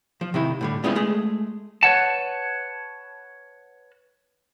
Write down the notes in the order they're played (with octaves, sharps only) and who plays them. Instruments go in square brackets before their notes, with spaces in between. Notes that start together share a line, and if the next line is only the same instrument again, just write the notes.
[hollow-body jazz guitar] F3
C3 D#3 E4
A2 D3 G3
G3 G#3 B3 C#4 E4 F4
G#3 A3 G#4
[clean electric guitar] B4 C#5 F#5 A5